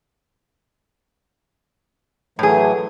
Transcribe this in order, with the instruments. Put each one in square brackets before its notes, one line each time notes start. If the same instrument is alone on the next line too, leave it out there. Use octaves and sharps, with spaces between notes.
[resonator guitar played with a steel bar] A2 G#4 [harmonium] E3 F#3 A3